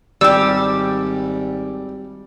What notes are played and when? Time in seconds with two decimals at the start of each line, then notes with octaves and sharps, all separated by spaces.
0.21 G#1 G3 G4 D5 E6